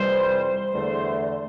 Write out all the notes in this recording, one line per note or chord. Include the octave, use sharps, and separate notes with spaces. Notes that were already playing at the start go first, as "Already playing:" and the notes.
Already playing: F2 C3 E3 G3 C5
E2 D3 A3